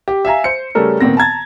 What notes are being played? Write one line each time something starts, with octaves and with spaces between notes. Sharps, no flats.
G4
E5 F5 G#5 A#5
C5 C#7
C#3 G3 A3 C#4 A4 A#4
A#2 D#3 B3 C4 A#6
A5 A#5 G#6 A6